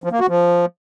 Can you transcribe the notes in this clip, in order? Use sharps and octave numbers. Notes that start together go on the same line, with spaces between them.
F3
A#3
F#4
F3